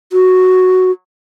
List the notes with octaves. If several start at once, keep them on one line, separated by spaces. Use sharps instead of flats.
F#4